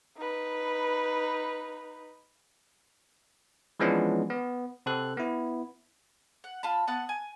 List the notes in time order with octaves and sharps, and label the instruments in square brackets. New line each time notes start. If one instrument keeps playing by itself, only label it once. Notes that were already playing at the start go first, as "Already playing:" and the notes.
[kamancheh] D#4 B4
[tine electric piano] E3 F3 G#3 B3 C#4 D4
B3
C3 C4 A4 F#6
B3 E4
[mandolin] F#5
F4 A5 B5
B3 F#5 A5 F#6
G#5